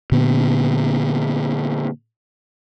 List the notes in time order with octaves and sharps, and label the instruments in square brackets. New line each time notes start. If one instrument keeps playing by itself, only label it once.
[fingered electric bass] A#2 D3 B3